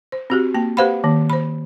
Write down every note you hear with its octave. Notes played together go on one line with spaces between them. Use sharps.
C5
C4 F#4 G4
A#3 G5
G4 B4 C5 F5 F#5 B5
D#3 A#3
C5 B5